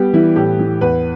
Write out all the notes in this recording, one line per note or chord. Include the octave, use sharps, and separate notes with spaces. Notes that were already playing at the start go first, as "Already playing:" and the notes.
Already playing: G3 B3 G4
E3 E4
A2 G4
E3
E2 B4